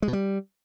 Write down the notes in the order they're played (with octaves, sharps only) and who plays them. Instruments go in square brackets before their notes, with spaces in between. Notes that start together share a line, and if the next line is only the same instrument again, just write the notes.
[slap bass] G#3
B2
G3